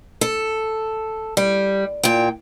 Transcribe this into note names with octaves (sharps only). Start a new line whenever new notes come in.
A4
G3
A#2 G5